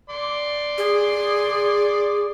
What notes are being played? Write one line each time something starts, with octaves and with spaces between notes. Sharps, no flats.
D5 C6
G#4